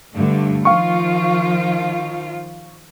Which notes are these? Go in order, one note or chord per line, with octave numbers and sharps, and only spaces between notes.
G2 D3 A3
D#3 F3 F4 F5 C#6